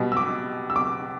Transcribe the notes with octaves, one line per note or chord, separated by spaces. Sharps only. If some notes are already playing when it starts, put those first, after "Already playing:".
Already playing: B2 G3
E6
D6
E6
D6